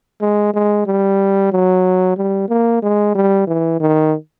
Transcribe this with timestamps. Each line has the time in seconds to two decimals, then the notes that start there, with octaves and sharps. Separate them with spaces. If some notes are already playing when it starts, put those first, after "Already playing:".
0.21 G#3
0.54 G#3
0.86 G3
1.52 F#3
2.17 G3
2.49 A#3
2.83 G#3
3.15 G3
3.47 E3
3.81 D#3